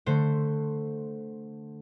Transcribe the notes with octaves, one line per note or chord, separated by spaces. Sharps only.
D3 A3 C5